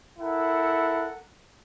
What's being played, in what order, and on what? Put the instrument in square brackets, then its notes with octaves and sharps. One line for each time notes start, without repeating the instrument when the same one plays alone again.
[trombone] E4 [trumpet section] A4 A#4 F#5